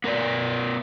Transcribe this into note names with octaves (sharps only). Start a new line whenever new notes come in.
B3 A#4 B4 D5